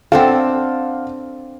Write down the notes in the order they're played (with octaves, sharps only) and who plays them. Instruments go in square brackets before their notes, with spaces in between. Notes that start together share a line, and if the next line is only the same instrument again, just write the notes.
[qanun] C4 D4 A4 [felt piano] F5 F#5